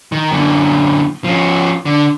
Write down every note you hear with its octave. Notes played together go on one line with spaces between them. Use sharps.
D#3
F#2 D3
F3 C#4
D3